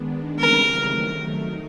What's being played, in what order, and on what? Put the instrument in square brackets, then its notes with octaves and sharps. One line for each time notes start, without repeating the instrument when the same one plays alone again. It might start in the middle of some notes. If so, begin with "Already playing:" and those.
Already playing: [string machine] D#3 G#3 B3 D4
[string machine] C#3 E3 G3 C4 [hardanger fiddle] A#4
[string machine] D#3 F#3 A3
D#4